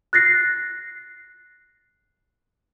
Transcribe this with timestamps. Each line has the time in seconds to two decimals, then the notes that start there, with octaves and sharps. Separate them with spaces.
0.13 F#6 A6 A#6 C7